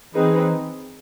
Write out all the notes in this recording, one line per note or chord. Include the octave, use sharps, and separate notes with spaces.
E3 C4 D#4 G#4 B4